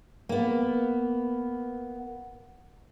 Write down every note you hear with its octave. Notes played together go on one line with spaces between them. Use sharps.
A#3 B3